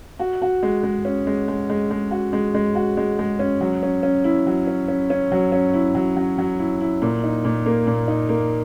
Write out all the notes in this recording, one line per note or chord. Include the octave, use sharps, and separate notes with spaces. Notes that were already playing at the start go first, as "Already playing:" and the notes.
F#4
F#4
G#3
G#3
C#4
G#3
G#3
G#3
G#3
F#4
G#3
G#3
F#4
G#3
G#3
C#4
F#3
C#4
C#4
E4
F#3
C#4
C#4
C#4
F#3
C#4
E4
F#3
F#3
F#3
E4
E4
A#2
D#4
A#2
A#3
A#2
D#4
A#3